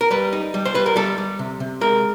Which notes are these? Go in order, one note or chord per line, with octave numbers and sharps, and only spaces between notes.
A#4
G3 B4
D#4
G3
C5
G3 B4
A#4
G3 A4
G3
C3
C3
G#3 A#4